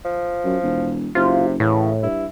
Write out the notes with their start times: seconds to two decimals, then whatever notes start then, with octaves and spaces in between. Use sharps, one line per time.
0.05 F3
0.45 F#2
0.63 E1
1.15 F#1 C3 F4
1.60 A2 C#3 E3
2.03 G2 E4